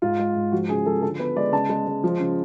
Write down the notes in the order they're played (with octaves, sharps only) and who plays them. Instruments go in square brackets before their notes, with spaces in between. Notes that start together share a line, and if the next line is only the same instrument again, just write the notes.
[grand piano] G#2 F4
G#3
G#2
F3 F#4
C#3 G#4
F3 A4
D3 A4
B3 B4
G#3 D5
C#3 A5
G#3
G#3
F3
C#3